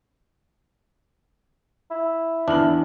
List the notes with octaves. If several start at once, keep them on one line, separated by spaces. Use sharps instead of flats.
E4
E2 D4 F6 F#7